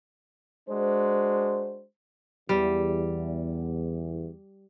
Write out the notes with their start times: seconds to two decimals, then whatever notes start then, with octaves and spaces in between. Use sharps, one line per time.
0.69 G#3 D4 F#4 C5
2.49 E2 G3